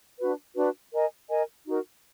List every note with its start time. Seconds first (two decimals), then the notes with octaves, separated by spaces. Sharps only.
0.19 D4 F#4 B4
0.56 D4 F#4 B4
0.93 A#4 D#5 G#5
1.29 A#4 D#5 G#5
1.66 D#4 F#4 A#4